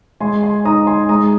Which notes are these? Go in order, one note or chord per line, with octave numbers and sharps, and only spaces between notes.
G#3 G#5 C6
G#5 C6
D#4 A#5 D#6
G#5 C6
G#3 A#5 D#6